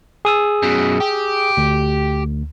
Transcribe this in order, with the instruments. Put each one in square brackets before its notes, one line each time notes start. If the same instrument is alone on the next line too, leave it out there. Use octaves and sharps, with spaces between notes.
[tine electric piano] G#4 D#6 E6
[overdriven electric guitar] F#2 B2
G4
[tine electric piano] D2